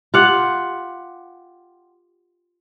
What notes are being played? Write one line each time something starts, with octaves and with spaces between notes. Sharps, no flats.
F4 G4 F5 F#5